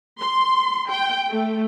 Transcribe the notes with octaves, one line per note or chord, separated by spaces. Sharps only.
C6
G5
A3